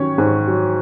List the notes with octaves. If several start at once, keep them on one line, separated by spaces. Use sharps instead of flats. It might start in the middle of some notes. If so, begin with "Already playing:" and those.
Already playing: D#3 F#3 C#4 C#5
G#2
F#3